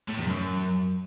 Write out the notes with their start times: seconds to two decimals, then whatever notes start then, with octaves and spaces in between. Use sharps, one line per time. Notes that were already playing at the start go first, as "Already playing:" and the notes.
0.09 A2
0.18 E2
0.27 F#2